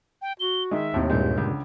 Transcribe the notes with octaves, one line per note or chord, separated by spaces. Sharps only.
G5
F#4 G7
D#3 G#3 E5
D#2 A2 C3 D#3
G2 A#2 G#3 G6
C#2 D3